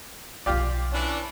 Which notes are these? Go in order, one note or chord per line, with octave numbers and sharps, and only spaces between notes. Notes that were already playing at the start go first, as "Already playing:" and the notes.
B1 F3 F4 G4 D5
E3 C#4 D4